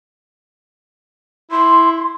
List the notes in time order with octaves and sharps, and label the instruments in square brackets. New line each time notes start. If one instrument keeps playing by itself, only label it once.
[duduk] E4 [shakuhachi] C6